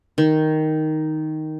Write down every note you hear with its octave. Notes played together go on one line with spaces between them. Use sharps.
D#3